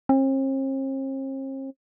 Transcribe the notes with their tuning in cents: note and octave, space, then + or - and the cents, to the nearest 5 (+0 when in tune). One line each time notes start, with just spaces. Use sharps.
C4 +45